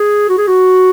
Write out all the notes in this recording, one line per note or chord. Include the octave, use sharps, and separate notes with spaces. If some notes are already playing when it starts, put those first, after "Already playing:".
Already playing: G#4
F#4
G#4
F#4